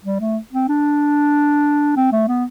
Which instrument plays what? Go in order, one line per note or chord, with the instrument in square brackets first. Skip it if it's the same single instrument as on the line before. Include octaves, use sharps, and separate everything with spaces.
[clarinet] G3
A3
C4
D4
C4
A3
B3